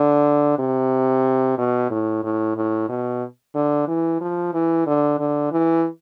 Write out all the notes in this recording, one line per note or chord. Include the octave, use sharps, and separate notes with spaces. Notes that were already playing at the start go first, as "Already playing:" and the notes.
Already playing: D3
C3
B2
A2
A2
A2
B2
D3
E3
F3
E3
D3
D3
E3